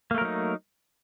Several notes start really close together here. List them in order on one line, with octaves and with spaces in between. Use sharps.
A#3 A3 A#4 F#3 D#4